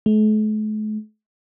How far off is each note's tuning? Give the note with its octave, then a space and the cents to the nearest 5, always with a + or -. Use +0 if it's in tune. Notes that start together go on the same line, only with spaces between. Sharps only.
A3 -45